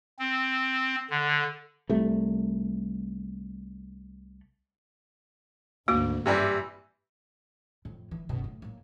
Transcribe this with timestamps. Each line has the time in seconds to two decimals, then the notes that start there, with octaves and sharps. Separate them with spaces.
0.19 C4
1.10 D3
1.90 C2 A3
5.88 G#1 D2 A#3 F#4
6.26 G2 C3 E3 G3
7.85 F2 A2
8.11 E3
8.29 F#1 B2
8.44 A2
8.62 A2 A#3